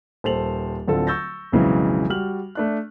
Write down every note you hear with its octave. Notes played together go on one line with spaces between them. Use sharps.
D#1 A4 C5 A5 F7 F#7
D1 D3 C4 F4 A4
C#6 E6 G6 A6 A#6
B1 F2 C#3 E3 F#3 G#3
G3 F#4 F6 F#7
A3 D4 F#6